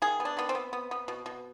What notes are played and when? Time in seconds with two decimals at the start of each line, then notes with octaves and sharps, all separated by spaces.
0.02 D#3 G#4
0.20 B3
0.25 D4
0.37 D#3 B3
0.49 C4
0.55 B3
0.73 B3
0.91 B3
1.08 B2
1.26 B2